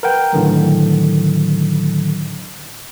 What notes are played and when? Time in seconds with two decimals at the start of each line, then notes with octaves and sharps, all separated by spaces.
0.03 A#4 B4 F#5 G5
0.33 A2 D3 D#3 F#3